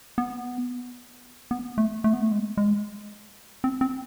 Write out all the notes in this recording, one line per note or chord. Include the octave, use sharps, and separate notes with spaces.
B3
B3
A3
A3
B3
A3
G#3
G#3
C4
C4